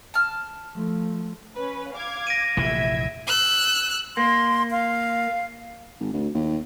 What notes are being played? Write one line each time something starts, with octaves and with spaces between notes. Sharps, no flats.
A5 F6
F3 A3
C#4 B4
F5 D6 G#6
A#6 D7 D#7
F1 A#1 E3 E5 G#6
E6 F#6
A#3 C6
F5
G#1
D2
D#2